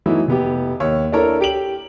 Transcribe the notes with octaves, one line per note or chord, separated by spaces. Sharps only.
E3 F#3 A3 B3 D#4 E4
F1 B3 G4
D#2 C#5
D4 E4 A4 A#4 C#5 A#5
G4 D7 F#7